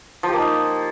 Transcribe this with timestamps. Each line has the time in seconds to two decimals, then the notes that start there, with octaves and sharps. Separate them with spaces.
0.23 F3
0.28 G4
0.33 A#3
0.38 D#4